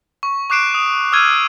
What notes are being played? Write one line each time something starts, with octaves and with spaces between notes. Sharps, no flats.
C#6
C#6 D6 F#6 C7 D7 E7
D#6
D6 E6 F6 G#6 D#7